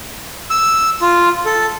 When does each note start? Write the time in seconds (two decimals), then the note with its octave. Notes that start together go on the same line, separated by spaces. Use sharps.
0.50 E6
1.02 F4
1.46 A4